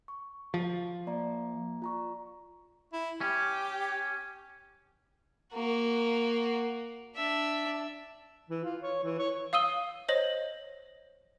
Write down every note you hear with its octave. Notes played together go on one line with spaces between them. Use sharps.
C#6
F3
A#3 D5 A#5
F4 A#5 C#6
E4
C#4 G4
A#3 F#4
D4 E5
E3
F4
C#5
E3
C#5
F5 D#6 E6 D#7 G7
C5 C#5 D#5 A#6 F#7